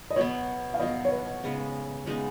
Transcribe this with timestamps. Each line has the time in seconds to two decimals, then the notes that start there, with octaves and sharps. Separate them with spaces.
0.10 D#5
0.16 B2 F#3 B3 C#5
0.74 F5
0.80 B2 F#3 B3 D#5
1.05 C#5
1.11 B4
1.44 C#3 G#3 B3 D#4
2.06 C#3 G#3 B3 D#4